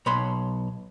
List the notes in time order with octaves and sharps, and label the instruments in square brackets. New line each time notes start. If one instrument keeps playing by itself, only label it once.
[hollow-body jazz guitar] B1 C#5 B5 C6